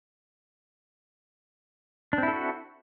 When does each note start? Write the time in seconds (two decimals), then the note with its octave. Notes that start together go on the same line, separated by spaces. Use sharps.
2.13 D4
2.18 C4
2.23 E4
2.28 A4
2.33 F#4